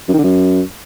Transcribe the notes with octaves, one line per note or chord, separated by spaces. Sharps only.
F#2
D#3
D3
F#2